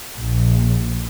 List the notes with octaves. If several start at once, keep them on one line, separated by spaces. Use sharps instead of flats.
A#1